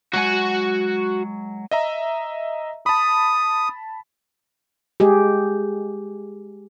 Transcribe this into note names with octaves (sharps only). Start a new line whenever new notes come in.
F#3 G#3 F#4 F#5 G#5
D#5 E5 A#5
A5 B5 D#6
G#3 G4 G#4